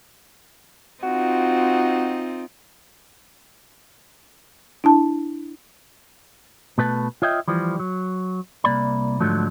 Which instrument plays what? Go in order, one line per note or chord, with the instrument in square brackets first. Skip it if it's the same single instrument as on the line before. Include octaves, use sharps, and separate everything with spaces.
[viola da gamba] C4 D#4 F4 [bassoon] F#4
[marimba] D4 E4 A5
[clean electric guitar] B2 A3 B4 A5
F4 C#5 D#5 E5 G5
E3 F3 G3
F#3
C2 A#3 D5 B5
G#2 D3 F3 F#3 A3